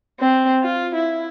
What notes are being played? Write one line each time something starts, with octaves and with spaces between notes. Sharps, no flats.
C4
F4
E4